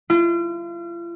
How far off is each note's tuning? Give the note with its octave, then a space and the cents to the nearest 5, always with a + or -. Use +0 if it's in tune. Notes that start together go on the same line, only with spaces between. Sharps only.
F4 -40